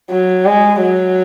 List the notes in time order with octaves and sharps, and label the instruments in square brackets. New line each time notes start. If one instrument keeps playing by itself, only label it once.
[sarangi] F#3
G#3
F#3